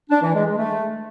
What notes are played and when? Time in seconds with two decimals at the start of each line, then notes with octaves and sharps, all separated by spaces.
0.10 D4
0.22 E3
0.34 G#3
0.45 G#3
0.57 A3